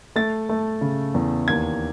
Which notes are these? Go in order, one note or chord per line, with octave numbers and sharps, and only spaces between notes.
A3 A6
A3
C#3
E2
D#2 G#6